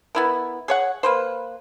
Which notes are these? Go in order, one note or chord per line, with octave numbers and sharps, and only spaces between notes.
B3 E4 A#4
G#4 C#5 F#5
A#3 B4 C5